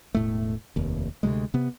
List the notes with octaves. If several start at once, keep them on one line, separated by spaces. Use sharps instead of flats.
E1 A2 A3
F1 D#2
D2 C3 G3 G#3
C3 B3